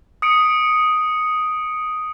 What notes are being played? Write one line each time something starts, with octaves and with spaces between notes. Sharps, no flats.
D#6 C#7 D7